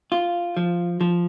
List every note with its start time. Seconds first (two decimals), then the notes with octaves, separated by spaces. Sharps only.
0.12 F4
0.57 F3
1.01 F3